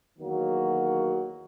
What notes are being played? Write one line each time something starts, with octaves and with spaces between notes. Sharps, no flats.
E2 D#3 F#3 A#3 F#4